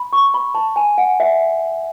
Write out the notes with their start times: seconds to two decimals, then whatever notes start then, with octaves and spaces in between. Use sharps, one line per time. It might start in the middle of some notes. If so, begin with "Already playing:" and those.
Already playing: B5
0.13 C#6
0.34 B5
0.55 A5
0.76 G#5
0.98 F#5
1.20 E5